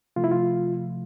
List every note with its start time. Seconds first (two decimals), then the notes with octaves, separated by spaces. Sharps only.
0.16 C3 F3 A3 F4
0.24 E4
0.31 F4